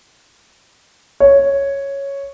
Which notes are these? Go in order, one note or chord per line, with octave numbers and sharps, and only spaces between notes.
C#5